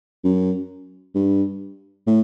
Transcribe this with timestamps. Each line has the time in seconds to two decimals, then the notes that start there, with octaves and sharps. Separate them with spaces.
0.24 F#2
1.15 G2
2.07 A2